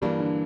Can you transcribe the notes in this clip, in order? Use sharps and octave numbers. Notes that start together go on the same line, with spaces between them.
G2 E3 G3 A#3 D4
D3